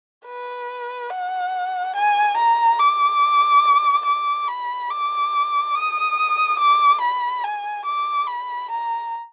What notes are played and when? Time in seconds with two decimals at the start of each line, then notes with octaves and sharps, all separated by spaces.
0.26 B4
1.10 F#5
1.95 G#5
2.37 A#5
2.79 D6
4.06 D6
4.48 B5
4.90 D6
5.74 D#6
6.59 D6
7.01 B5
7.44 G#5
7.85 D6
8.27 B5
8.70 A#5